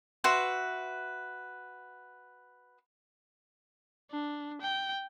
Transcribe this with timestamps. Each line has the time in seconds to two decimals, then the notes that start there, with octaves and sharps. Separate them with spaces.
0.24 F#4 B4 E5 C6
4.11 D4
4.62 G5